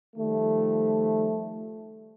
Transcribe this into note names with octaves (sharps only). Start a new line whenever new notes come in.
D#3 F3 G3 A3